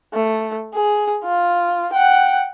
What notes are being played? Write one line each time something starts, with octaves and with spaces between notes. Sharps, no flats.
A3
G#4
F4
F#5 G5